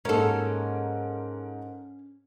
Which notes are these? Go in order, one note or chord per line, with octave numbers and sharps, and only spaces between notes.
G#2 A#3 C#4 A4 A#4